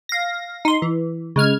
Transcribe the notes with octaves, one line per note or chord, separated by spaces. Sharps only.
F5 A#6
D#4 C6
E3
C#3 G#3 F6 G#6